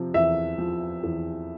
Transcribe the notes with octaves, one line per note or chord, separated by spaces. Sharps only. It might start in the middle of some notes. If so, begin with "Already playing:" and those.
Already playing: C3 F3
E2 E5
F3
E2